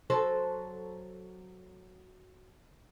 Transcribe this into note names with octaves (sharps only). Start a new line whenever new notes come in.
F#3 A4 C5